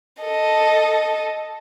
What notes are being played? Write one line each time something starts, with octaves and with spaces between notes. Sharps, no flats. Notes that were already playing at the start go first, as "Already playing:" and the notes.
A4 D#5